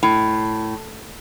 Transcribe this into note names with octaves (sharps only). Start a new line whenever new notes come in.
A2